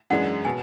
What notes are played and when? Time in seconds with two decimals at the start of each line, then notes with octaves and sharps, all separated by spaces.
0.10 F#2 E3 G#3 D4 F#5
0.45 B2 G#5